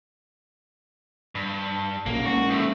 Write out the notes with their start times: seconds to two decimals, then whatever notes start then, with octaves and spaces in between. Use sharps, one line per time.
1.35 G2
2.06 B1 A#2 C#3 A#3
2.25 G#3 A#3 C#4 F#4
2.50 F3 A3